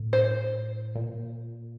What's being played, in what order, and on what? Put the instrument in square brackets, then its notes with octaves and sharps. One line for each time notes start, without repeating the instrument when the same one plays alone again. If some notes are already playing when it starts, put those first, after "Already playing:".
Already playing: [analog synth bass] A2
[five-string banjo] C5
[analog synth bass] A#2